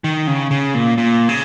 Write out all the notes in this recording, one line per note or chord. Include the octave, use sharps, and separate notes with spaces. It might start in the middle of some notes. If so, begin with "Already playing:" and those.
D#3
C#3
C#3
A#2
A#2
C#3